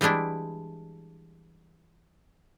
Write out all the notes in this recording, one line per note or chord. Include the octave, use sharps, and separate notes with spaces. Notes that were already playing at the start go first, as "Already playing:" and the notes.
E3 G3 G#3 D4 E4